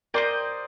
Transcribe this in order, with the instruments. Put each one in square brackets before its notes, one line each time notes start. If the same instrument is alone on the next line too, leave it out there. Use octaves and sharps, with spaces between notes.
[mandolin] G4 C5 D#5 [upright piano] A#4 D5